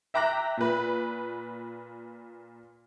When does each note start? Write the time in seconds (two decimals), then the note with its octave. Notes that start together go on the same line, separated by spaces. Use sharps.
0.14 E5 G5 A#5 D6 F#6 A#6
0.57 A#2 B4